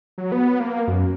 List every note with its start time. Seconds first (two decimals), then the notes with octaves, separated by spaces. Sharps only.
0.18 F#3
0.32 B3
0.60 A#3
0.88 F#2